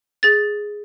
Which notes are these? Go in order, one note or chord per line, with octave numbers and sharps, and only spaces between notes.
G#4 A6